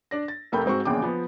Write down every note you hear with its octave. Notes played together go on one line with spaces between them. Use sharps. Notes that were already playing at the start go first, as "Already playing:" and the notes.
D4 D5 A#6
A6
F1 A3 A#4 G5 B5 G6
G#2 C4 F#4 C#6
A#1 E2 C#3 G5 D6
F3 B3